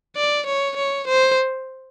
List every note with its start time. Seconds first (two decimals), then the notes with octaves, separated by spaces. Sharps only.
0.16 D5
0.46 C#5
0.76 C#5
1.07 C5